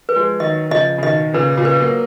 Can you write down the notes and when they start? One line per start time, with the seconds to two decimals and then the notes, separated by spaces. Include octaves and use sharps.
0.09 B4
0.16 F3 G#3
0.40 D#3 F#3 D#5
0.71 C#3 F3 D#5
0.98 C#3
1.03 B2 D#3 D#5
1.34 A#2 C#3 B4
1.57 A#2 C#3
1.65 B4
1.80 F#3 A#3